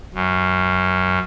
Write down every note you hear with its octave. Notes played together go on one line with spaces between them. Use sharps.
F#2